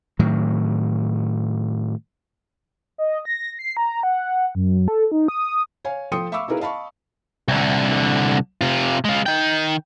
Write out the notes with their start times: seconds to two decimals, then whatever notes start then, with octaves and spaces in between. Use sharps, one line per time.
0.19 A2 D#3 F#3
2.98 D#5
3.25 A#6
3.59 C7
3.77 A#5
4.03 F#5
4.55 F#2
4.88 A4
5.12 D#4
5.28 D#6
5.85 C#5 F5 G#5
6.12 F3 A4 G5 C6 D#6 C#7
6.32 E5 F5 B5 C#6 D6 E6
6.48 D#4 E4 G#4 A#4 B4 F5
6.60 D#5 F5 A5 B5 C#6
7.48 C2 D3
8.61 C3 F4
9.05 G#3 F4
9.26 D#3 G5